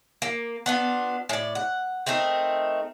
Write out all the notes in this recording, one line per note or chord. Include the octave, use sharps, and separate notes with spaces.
A#3
B3 D4 F4
A2 D5
F#5
A3 C4 D#4 A#4